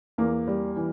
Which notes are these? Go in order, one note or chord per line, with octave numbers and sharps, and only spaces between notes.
E2 A#3
G3
E3